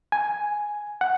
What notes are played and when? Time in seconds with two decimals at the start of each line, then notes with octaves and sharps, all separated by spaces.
0.12 G#5
1.01 F#5